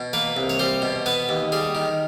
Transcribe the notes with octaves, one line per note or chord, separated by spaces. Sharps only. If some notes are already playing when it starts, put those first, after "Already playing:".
Already playing: B2
A#3 B4
C2
C#5
G3 C5
B2
B3 B4
D#2
G3 G#4
D#3